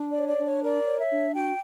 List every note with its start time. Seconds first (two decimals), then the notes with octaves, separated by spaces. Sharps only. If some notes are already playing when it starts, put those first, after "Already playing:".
Already playing: D4
0.09 D5
0.16 C#5
0.27 D5
0.39 D4
0.45 C#5
0.62 A#4 D5
0.86 C#5
0.99 E5
1.10 D4
1.34 F#4 G5